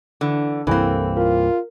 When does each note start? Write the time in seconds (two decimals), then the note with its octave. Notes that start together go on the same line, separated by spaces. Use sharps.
0.21 D3 E3
0.67 C2 G2 E3 A#3 C4 E4 A4 A#4
1.17 F4 A#4